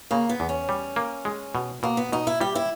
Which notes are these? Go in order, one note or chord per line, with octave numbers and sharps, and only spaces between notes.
C#3 A#3
B3
E2
C#4
G3
A#3
G#3
B2
B2 A#3
B3
B2 D#4
E4
G3 G4
E4